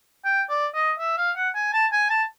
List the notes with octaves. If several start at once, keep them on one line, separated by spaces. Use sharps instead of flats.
G5
D5
D#5
E5
F5
F#5
G#5
A5
G#5
A5